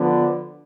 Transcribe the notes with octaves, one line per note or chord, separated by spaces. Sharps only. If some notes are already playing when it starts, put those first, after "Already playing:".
Already playing: D3 F3 B3